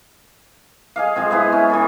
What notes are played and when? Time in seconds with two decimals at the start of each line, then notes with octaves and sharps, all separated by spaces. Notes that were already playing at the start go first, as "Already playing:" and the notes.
0.96 G#4 D#5 F5
1.16 F3 G#3 C4
1.31 G#3 B3 E4
1.52 C#4
1.70 E3 C#4 A4